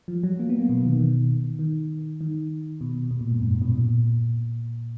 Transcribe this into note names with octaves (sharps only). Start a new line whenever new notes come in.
F3
F#3
A#3
B3
A#3
B2
D#3
D#3
D#3
D#3
B2
B2
A#2
G#2
F#2
G#2
B2
A#2